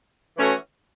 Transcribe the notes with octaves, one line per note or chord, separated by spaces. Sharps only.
E3 A3 C#4 F#4 A4